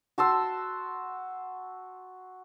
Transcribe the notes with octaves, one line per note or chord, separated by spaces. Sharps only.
F#4 A5 C6 E6